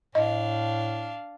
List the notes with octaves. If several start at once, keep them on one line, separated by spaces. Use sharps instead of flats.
A2 D4 D#5 F5